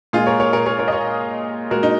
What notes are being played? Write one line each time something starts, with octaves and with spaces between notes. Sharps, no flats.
A#2 G#3 F4 G#4
A#4 C#5
A#4 C#5
A#4 C#5
A#4 C#5
A#4 C#5
D#5
A#4 C#5
A#2 G#3 F#4 A#4
D#4